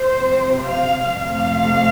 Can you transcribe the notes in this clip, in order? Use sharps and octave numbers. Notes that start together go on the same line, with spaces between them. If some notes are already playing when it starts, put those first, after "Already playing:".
Already playing: C5
C3 F3 C4
F5
F2 C3 A3 F5